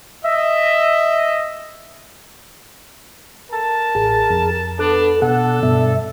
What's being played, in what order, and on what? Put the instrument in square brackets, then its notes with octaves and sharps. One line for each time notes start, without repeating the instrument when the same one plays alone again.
[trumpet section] D#5 E5
[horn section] A#4 A5
[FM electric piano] A1 [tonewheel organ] G#4
[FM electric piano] F2
[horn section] B3 D4 [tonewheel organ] A4
[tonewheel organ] B2 F#5 [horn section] D4 A4
[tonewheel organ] G2 E5 [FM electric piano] B2